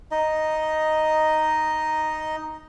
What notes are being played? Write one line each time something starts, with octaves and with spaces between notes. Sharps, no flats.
D#4 D#5